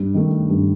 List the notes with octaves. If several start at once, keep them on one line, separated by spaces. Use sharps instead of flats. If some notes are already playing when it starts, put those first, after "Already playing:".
Already playing: G2
D#3 A3
G2